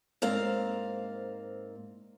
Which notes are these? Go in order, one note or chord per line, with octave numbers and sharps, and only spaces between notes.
G#2 A#3 C4 D5 F5 A#5